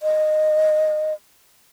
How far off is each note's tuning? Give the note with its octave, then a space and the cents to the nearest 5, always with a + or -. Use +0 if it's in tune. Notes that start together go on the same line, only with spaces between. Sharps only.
D#5 -15